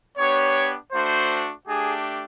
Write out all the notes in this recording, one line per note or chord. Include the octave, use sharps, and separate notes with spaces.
B3 D4 G4 C#5
A3 D4 F#4 C5
A3 D4 G4 G#4